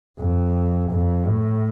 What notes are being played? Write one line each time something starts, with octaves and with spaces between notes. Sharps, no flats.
F2
F2
A2